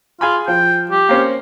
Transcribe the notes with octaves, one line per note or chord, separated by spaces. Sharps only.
F4 G#4 G#5 B5
F3 G5
G4
A#3 C4 C#4